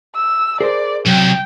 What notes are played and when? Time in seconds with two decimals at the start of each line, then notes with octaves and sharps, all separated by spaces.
0.16 E6
0.61 G#4 A#4 C5 D5
1.06 C2 F#3 G5